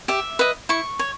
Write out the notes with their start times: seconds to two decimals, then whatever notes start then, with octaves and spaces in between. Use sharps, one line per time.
0.08 G4 E5
0.39 B4 D#5
0.69 E4 C#6
0.99 C#5